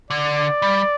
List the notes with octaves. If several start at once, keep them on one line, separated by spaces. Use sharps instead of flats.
D3 D5
G3